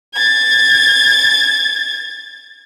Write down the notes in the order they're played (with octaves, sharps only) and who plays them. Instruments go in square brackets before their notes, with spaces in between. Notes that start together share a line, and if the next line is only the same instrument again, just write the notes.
[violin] G#6 A6